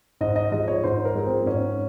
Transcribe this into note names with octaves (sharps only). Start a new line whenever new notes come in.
G#2 D#5
D#5
F3 G#3 D#5
C#5
G#2 C5
A#4
F3 G#3
C4
G#2 C#4